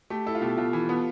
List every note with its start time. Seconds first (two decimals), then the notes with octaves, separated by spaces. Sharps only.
0.10 A3 G4
0.26 E4 A4
0.35 F4
0.41 B2 G4
0.57 B2 F4
0.73 E3
0.89 B3